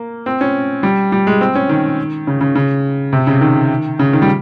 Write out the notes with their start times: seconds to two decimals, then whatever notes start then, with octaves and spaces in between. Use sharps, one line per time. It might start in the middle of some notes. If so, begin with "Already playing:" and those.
Already playing: A#3
0.26 C4
0.41 C#4
0.83 G3
1.12 G3
1.27 G#3
1.41 C4
1.55 C#4
1.69 D#3
2.27 C#3
2.41 C#3
2.55 C#3
3.13 C3
3.27 C#3
3.41 D#3
3.99 C#3
4.13 D#3
4.22 G3